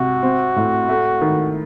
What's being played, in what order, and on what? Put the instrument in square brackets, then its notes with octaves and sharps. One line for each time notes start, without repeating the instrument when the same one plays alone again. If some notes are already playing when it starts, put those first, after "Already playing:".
Already playing: [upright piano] C3 [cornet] F#4
[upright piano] C4
A2
A3
D#3